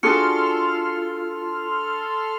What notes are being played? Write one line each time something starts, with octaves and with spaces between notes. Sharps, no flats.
D4 F4 F#4 G#4 A4 C6 F6 C#7